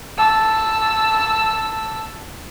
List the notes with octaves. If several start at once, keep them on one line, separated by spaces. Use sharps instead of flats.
A5 E6